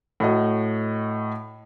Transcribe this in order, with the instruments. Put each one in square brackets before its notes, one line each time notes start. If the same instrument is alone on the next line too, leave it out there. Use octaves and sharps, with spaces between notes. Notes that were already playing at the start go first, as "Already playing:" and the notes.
[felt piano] A2 F#4 D#5